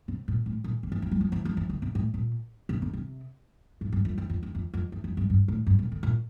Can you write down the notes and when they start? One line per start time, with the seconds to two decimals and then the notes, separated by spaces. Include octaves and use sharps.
0.08 C3
0.28 A#2
0.46 A2
0.64 A#2
0.83 D3
0.92 E3
1.02 F3
1.11 G3
1.21 F3
1.32 E3
1.45 F3
1.57 E3
1.70 D3
1.82 C3
1.95 A2
2.14 A#2
2.69 C3
2.82 D3
2.93 C3
3.81 A2
3.92 G2
4.05 F2
4.18 E2
4.30 F2
4.43 E2
4.55 F2
4.74 F2
4.92 E2
5.04 F2
5.17 G2
5.30 G2
5.48 A2
5.67 G2
5.79 A#2
5.92 D3
6.03 A#2